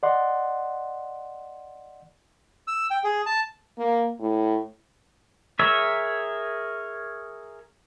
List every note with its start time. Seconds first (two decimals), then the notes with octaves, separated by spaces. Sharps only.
0.03 D5 D#5 F#5 C6
2.68 E6
2.91 G5
3.04 G#4
3.26 A5
3.78 A#3
4.19 A2
5.59 G#4 A#4 C#5 E5